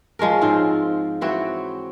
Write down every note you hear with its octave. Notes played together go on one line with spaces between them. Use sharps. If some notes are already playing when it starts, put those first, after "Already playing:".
F3 G#3 C#4 A#4
G#2 C4 F4
E3 C4 F#4 C#5